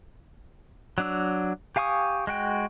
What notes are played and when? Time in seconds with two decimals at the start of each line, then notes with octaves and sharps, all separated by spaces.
0.98 F#3 D4 E6
1.76 G4 F5 G#5 C#6 D#6
2.27 G#3 F#4 G5